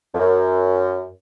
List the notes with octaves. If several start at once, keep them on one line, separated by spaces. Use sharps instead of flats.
F2
F#2